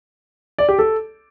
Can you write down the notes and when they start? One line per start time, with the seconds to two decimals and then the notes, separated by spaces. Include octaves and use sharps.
0.58 D5
0.69 G4
0.79 A4